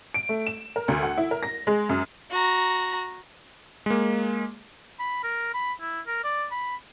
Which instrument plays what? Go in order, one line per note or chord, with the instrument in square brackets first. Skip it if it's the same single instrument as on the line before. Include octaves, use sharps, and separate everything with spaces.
[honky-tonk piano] D7
A3
E7
A#4
D2
F#5
E4
A#4
A#6
G#3
F#2
[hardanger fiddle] F#4 A#5
[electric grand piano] G#3 A#3
[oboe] B5
A#4
B5
E4
A#4
D5
B5